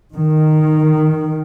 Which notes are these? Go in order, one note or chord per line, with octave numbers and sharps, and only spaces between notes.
D#3